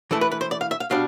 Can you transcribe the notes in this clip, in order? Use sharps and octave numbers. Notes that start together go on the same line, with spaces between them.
E3 A3 E4 A4
B4
B4
C5
D5
F5
E5
F5
B2 G3 D4 F5